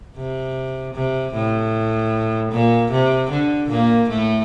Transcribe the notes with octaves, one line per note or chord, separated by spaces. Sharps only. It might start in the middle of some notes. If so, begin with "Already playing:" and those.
C3
C3
A2
A#2
C3
D3
A#2 A#3
A2 A3